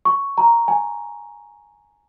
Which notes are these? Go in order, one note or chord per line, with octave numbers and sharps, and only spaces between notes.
C#6
A#5
G#5